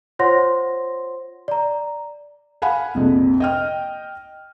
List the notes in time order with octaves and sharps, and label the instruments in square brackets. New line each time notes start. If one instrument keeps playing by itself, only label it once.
[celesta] F4 C5 C#5 F#5 C6 A#6
D5 A#5
[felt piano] F5 F#5 G#5 B5
A#1 F2 C3
D#5 G5 F6